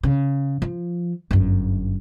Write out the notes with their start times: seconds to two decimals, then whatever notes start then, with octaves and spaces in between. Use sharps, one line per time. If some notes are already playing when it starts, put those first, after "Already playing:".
0.03 C#3
0.62 F3
1.31 G1 F#2